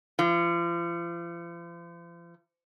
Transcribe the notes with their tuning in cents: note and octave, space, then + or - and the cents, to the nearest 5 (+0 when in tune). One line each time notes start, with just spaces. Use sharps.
F3 -40